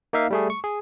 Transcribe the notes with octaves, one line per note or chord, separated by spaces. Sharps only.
A#3 D#4 E5 F5
G3 A3 G#4
C#6
G#4